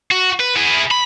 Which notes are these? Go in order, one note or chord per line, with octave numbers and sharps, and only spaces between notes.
F#4
B4
E4 G#4
B5